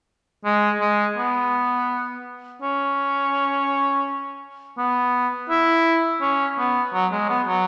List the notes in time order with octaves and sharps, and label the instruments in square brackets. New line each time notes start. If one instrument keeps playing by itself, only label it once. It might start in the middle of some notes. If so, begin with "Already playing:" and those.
[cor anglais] G#3
G#3
B3
C#4
B3
E4
C#4
B3
F#3
G#3
B3
F#3